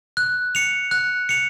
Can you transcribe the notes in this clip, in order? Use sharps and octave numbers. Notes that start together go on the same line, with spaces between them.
F#6
C#7 F7
F#6
C#7 F7